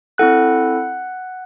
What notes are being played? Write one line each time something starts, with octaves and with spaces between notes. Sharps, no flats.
C4 E4 A4 F#5 F#6